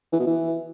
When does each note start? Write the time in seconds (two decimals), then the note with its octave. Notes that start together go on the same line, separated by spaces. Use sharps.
0.13 E3
0.20 B2
0.27 E3